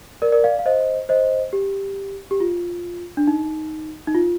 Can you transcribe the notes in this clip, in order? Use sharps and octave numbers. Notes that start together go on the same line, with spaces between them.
A#4 D5
A#4 D5
D5 F5
F5
C5 D#5
C5 D#5
G4
G4
F4
D4
D#4
D#4
F4